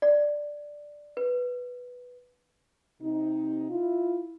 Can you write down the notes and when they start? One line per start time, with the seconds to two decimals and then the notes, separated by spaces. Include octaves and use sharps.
0.02 D5
1.17 B4
3.02 C3 D#4
3.70 E4 F4